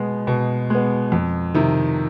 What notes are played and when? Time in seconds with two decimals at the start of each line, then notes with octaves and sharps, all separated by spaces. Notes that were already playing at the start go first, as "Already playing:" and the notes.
Already playing: B2 G#3 B3
0.27 B2
0.70 G#3 B3
1.12 F2
1.55 C3 D#3